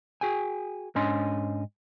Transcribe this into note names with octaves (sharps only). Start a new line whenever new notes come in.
F#4 G#4 G5 G#5
G#2 C#4 D4 D#5 G#5 C6